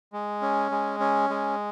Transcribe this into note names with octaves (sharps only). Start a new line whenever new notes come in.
G#3
C#4
G#3
C#4
G#3